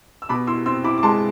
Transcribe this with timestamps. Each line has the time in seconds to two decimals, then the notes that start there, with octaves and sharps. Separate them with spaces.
0.22 E6
0.29 B2 B5 D6
0.47 E4 C6 E6
0.66 C4 C6 E6
0.84 E4 B5 D6
0.98 D6
1.03 G#3 A5 C6